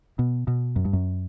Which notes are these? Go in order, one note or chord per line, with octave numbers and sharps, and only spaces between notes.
B2
B2
F#2
G2
F#2